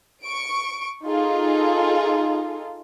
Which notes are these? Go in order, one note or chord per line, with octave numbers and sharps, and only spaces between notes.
C#6 D7
D#4 F4 G#4 A4